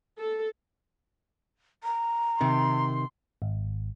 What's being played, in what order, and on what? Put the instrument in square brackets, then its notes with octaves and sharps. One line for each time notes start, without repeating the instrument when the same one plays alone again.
[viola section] A4
[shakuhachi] A#5
[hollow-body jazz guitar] C3 D#3 [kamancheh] C6
[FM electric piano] G#1